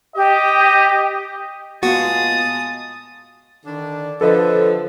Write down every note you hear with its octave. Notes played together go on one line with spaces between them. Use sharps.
G4 D#5
A#2 G#3 B3 F4 F#4 A5 D#6
D3 D#3 D4
D3 F3 A4 B4 D#5